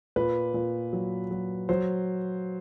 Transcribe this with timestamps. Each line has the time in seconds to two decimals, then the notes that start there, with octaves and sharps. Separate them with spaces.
0.16 A#2 B4
0.54 A#2
0.93 F#3
1.31 F#3
1.69 F#3 C5